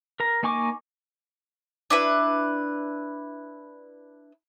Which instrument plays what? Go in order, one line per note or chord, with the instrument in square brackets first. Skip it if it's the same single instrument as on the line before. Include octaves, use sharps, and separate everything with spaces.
[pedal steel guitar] A#4 A#5
A#3 D#4 G#5 C#6 D6
[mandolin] D4 E4 B4